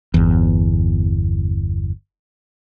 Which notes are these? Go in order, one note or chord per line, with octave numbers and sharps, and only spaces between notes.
G1 E2